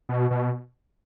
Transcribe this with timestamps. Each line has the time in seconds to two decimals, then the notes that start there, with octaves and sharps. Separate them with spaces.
0.09 B2
0.31 B2